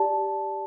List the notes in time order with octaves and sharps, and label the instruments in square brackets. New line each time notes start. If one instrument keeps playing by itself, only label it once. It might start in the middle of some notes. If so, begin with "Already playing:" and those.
Already playing: [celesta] G4 D5 A5